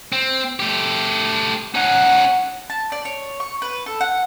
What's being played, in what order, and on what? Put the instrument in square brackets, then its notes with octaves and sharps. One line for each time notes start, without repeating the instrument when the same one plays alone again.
[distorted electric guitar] C4
A3 G4
[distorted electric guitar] C#4 D#4 [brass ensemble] F#5
[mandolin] A5
D5
C#5
C#6
B4
A4
F#5